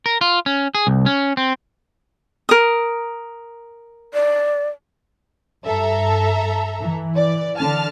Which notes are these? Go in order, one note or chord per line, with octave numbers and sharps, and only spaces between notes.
A#4
F4
C#4
G#4
C2
C#4
C4
A#4 D#6
D5
G2 A4 E5 A#5
E3
D5
D3 A5 F6